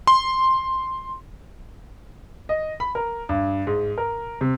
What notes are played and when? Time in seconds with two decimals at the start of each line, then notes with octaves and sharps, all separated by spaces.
0.07 C6
2.49 D#5
2.80 B5
2.95 A#4
3.29 G2
3.67 G#2
3.98 A#4
4.41 C3